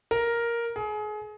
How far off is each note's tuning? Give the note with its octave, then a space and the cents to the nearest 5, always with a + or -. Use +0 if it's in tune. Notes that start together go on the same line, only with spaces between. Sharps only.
A#4 +5
G#4 +30